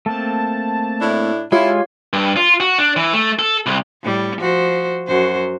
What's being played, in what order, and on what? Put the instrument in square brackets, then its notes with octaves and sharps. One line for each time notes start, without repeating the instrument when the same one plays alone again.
[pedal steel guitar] A3 A#3 C4 [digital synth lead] A5
[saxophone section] A2 D4 E4
[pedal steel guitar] G#3 G#5 [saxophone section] E4 [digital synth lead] F4 [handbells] G4 C#5 F5
[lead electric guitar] G2
F4
F#4
D4
E3
A3
A4
C2
[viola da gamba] A2 G3
F3 F#4 C5
F#2 F#4 C5